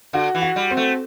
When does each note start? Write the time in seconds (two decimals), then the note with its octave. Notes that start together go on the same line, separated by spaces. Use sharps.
0.13 D3 F#4
0.35 E3
0.42 F#4
0.56 G3
0.71 C4
0.77 A3